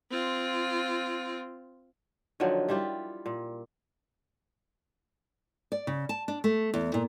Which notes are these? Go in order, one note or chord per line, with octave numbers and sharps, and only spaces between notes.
C4 F4
D3 D#3 F3 F#3
G3 E4 F4 G4
A#2
D5
C#3
A5
D4
A3
E2
A#2